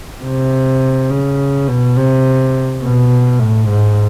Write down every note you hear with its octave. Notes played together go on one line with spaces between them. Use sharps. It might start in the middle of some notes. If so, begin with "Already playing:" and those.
C3
C#3
B2
C3
B2
A2
G#2